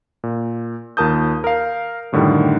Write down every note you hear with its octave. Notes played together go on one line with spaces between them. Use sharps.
A#2
D#2 F4 A#4 A5 D#6 G6
A#4 F5
F#2 A2 D3 D#3 G3